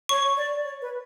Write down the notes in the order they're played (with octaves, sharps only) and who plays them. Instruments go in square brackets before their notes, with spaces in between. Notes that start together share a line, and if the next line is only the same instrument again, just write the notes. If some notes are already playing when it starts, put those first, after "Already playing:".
[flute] C#5 [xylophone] C#6
[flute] D5
C#5
B4